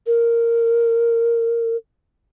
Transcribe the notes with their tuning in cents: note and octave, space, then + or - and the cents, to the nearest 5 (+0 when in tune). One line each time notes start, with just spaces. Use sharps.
A#4 -10